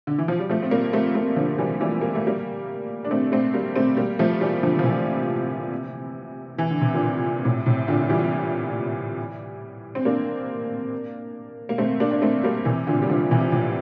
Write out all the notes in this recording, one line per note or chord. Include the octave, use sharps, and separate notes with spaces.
D3
E3
F3
G3
F3 A3
C4
G3 A#3
A3 C4
A3 C4
D3 F3
E3 G3
E3 G3
A#3
A3
G3 A#3
D4
A3 C4
A3 C4
G3 A#3
A3 C4
G3 A#3
F3 A3
E3 G3
D3 F3
F3
C3 E3
E3
D3
C3
A#2 D3
A2 C3
A2 C3
A#2 D3
E3 G3
C4
A#3 D4
A#3
A3 C4
A#3 D4
D4
A3 C4
G3 A#3
C3 E3
A#2 D3
G3
D3 F3
C3 E3
A2 C3